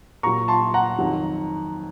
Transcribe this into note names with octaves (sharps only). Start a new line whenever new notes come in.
A#2 F#3 A#5 C#6
A5 C6
F#5 A#5
F2 D#3 F#3